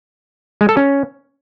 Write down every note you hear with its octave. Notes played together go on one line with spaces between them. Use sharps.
G#3
A4
C#4